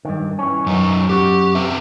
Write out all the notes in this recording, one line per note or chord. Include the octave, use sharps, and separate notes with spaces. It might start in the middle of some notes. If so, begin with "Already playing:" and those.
G2 D#3
E3 C#4
F#2 F#3 D#4
F#2 F#4 G4
C4 B4 E5